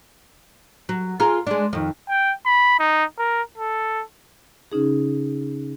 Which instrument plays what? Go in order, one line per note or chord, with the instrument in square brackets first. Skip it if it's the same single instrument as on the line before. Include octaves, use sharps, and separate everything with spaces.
[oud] F#3
F4 G#4 A#4
G#3 D4
F2 D#3
[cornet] G5
B5
D#4
A#4
A4
[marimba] C#3 C#4 D#4 G#4